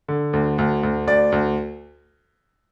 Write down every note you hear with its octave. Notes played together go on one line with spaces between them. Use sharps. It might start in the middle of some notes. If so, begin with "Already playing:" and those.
D3
D2
D2
D2
D2 D5
D2